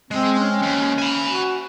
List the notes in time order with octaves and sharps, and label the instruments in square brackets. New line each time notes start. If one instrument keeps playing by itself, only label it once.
[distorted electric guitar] G#3 [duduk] C4
[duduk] C#4
[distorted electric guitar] D#2
G#5 B5
[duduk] F#4